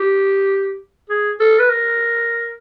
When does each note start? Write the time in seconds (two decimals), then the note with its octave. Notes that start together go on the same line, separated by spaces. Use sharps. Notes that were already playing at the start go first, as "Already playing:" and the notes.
Already playing: G4
1.10 G#4
1.40 A4
1.59 B4
1.70 A#4